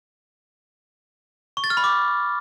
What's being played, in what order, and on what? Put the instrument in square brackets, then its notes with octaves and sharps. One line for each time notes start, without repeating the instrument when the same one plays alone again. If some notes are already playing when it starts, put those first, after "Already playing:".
[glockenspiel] C#6
A6
F6
B5
D6